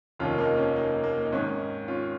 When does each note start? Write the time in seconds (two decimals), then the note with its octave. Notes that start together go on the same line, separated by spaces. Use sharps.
0.19 F1 D#2 D#3 C#4 F4
0.38 A#3 D#4
0.57 C#4
0.76 A#3 D#4
1.04 A#3
1.25 D#4
1.33 G#1 G#2 D#3 C#4
1.88 C#4 F4